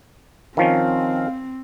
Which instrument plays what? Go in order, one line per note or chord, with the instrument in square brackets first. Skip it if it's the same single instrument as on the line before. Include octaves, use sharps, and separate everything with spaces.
[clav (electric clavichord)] D#3 F3 C#4 [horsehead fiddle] C4 [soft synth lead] F5